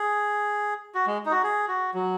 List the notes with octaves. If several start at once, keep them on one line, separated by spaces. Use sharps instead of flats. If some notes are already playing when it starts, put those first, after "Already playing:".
Already playing: G#4
F#4
G#3
D#4
F#4
G#4
F#4
F#3